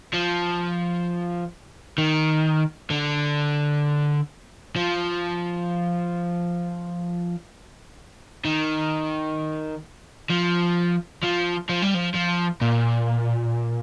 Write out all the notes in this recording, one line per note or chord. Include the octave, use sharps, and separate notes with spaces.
F3
D#3
D3
F3
D#3
F3
F3
F3
G3
F3
F3
A#2